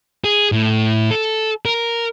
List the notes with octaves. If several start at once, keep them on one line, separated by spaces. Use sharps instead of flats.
G#4
A2
A4
A#4